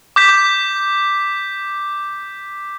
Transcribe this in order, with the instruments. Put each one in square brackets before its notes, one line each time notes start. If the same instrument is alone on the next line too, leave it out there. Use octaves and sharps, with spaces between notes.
[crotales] D6 G6 B6